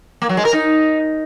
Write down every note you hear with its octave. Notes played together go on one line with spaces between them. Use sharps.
A#3
F#3
G#3
A#4
D#4